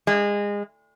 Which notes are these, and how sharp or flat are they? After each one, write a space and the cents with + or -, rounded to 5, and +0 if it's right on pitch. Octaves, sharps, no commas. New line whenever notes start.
G#3 -25